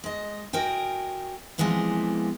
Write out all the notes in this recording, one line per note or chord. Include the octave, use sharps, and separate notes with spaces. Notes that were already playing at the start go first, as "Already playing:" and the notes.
G#3 D#5
F#4 A#4 D#5 G5 G#5
C3 E3 F3 G#3 A#3 B3